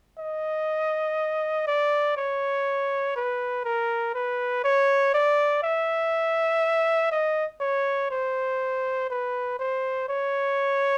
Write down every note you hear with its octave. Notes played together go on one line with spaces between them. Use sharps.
D#5
D5
C#5
B4
A#4
B4
C#5
D5
E5
D#5
C#5
C5
B4
C5
C#5